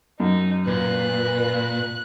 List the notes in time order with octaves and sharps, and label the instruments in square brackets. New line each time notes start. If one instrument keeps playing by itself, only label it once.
[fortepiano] F#2 [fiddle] D#4
[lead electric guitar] A#2 [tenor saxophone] B4 [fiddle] F#6